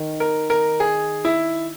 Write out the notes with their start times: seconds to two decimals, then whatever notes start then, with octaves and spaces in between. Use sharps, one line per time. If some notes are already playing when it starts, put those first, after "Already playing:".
Already playing: D#3
0.20 A#4
0.50 A#4
0.80 G#4
1.25 E4